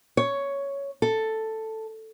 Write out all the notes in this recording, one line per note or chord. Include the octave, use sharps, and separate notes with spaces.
C#5
A4